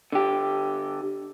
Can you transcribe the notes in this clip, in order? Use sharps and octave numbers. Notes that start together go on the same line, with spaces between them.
D3 G4